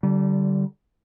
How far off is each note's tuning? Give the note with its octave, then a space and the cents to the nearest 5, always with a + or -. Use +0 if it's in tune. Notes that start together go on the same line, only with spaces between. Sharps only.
D3 +0 G3 -30